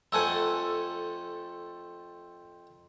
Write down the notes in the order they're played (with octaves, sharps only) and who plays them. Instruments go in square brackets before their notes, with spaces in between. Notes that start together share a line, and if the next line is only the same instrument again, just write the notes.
[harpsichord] F2 A3 F#5 [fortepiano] A4 G#5 E6